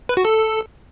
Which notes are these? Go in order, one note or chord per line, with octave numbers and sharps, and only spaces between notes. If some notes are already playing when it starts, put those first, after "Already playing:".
B4
F#4
A4